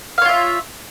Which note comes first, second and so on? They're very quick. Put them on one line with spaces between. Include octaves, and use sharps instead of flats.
F5 C#5 F4 E5